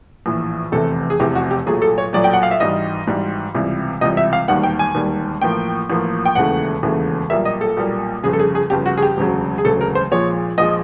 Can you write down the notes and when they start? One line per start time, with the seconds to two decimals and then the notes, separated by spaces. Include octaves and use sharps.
0.26 A#1 A2 E3
0.72 F1 E2 C3 E3 A4
1.10 G#4
1.19 F1 E2 C3 E3 G4
1.35 F#4
1.51 G4
1.66 B1 A#2 F#3 A3 G#4
1.82 A4
1.98 C#5
2.13 B1 A#2 F#3 A3 D5
2.24 G5
2.33 F#5
2.43 F5
2.51 E5
2.60 G#1 G#2 E3 G3 D#5
3.07 G#1 G#2 E3 G3
3.55 C#2 C3 E3 G3
4.01 C#2 C3 E3 G3 D#5
4.17 E5
4.33 F5
4.48 E1 D#2 D#3 G3 F#5
4.63 G5
4.79 G#5
4.95 E1 D#2 D#3 G3
5.41 A1 A2 F3 A#3 G5
5.90 A1 A2 F3 A#3
6.26 G5
6.35 E1 D#2 C#3 E3 A3 F#5
6.82 E1 D#2 C#3 E3 A3
7.30 B1 A#2 G3 A#3 E5
7.45 D#5
7.61 A4
7.77 B1 A#2 G3 A#3
8.23 G1 F2 C#3 G#4
8.33 A4
8.39 G#4
8.55 G#4
8.70 G1 F2 C#3 G4
8.86 F#4
8.98 G#4
9.02 G4
9.17 E1 D2 C#3 F#3
9.58 G#4
9.64 E1 D2 C#3 F#3 A4
9.81 A#4
9.95 C5
10.11 A#1 A#2 F3 G#3 C#5
10.58 A#1 A#2 F3 G#3 D#5